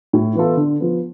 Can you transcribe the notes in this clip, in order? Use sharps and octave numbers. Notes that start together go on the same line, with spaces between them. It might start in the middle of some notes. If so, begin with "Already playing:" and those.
A2
E3 B3 F4 A4
D3
F3 B3